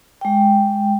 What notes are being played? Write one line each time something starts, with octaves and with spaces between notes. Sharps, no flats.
G#3 G5